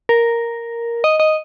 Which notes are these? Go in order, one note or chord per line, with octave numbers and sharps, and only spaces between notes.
A#4
D#5
D#5